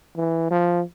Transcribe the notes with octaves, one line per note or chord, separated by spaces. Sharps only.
E3
F3